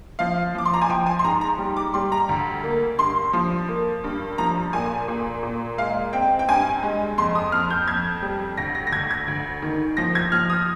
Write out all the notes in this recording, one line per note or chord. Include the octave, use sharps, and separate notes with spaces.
F3 F5
F3 D6
C6
A#5
G#5
F3 G5
G#5
C6
G#2 A#5
A#5
G3
D6
G3 C6
A#5
D2
A#3
G2 C6
F3
A#3
G2
F3 A#5
A#2 G#5
A#2
A#2
G#3 F5
C4 G5
G5
G2 G#5
G#3
F2 C6
D#6
F2 F6
G6
F2 G#6
G3
D2 A#6
A#6
A#6
D2 G#6
G#6
D2
D#3
F3 A#6
G#6
F3 F6
D#6